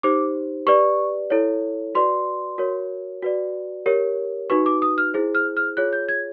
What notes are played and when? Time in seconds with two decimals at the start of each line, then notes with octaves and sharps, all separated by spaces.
0.03 D#4 G4 C5 D6
0.67 G4 B4 D5 C#6
1.30 E4 A4 C#5
1.95 F#4 B4 D5 C6
2.58 F#4 A#4 C#5
3.22 F#4 B4 D5
3.86 G4 A#4 C#5
4.50 D#4 F#4 B4 C#6
4.66 D6
4.82 D#6
4.98 F6
5.14 E4 G#4 C5
5.35 F6
5.57 F6
5.77 F4 G#4 C#5 F#6
5.93 G6
6.09 G#6